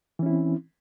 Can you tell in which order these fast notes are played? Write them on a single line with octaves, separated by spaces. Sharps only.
E3 C#4 E4 C4